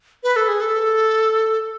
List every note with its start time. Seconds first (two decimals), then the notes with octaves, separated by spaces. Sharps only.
0.23 B4
0.36 A4
0.48 G#4
0.61 A4